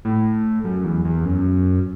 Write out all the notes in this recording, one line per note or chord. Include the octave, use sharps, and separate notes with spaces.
A2
F#2
E2
E2
F#2